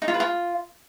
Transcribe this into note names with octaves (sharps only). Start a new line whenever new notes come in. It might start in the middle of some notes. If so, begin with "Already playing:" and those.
D#4
F4
B4
F4